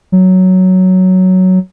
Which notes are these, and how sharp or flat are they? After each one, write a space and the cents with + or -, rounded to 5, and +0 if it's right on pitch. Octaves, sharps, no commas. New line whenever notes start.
F#3 +5